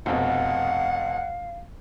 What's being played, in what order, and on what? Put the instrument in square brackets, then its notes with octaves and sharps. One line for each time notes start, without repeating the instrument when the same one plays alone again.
[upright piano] F1 F2 B2 [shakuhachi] F5 [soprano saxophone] F#5